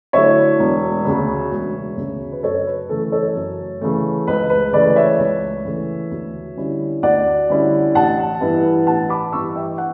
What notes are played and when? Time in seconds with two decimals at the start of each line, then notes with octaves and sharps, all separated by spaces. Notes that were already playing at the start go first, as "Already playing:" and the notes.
0.13 D3 F#3 A3 E4 C#5 E5
0.59 E1
1.05 D2 C#3
1.51 E1
1.97 D2 C#3
2.32 B4
2.43 F#2 A4 C#5
2.67 B4
2.89 C#3 E3 A3 A4
3.12 A4 C#5
3.35 F#2
3.81 C#3 E3 A3
4.27 C#2 B4
4.50 B4
4.73 C#3 E3 A3 B4 D5
4.96 C#5 E5
5.19 C#2
5.65 C#3 E3 A3
6.11 D2
6.57 D3 G3 C#4 E4
7.03 D2 D5 F#5
7.49 D3 G3 C#4 E4
7.95 A1 F#5 A5
8.40 G2 E3 B3 E4
8.87 A1 F#5 A5
9.09 B5 D6
9.32 G2 E3 B3 E4 C#6 E6
9.56 E5 G5
9.78 F#5